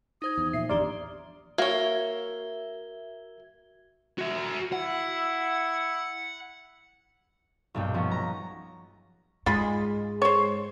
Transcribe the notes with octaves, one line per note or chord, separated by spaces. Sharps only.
D#4 C5 D#6 G#6
E2
A#2 F3 E5 C7
G#1 E2 F3 D4 G4 D5 A#5 G7
A#3 F#4 C#5 E5 G#6 G7
F#4 E5
E4 F#5
B1 G2 A#2 G5
F3 B3 C#4 F#4
A#5
G#2 G#3 F4 B5
C5 C#5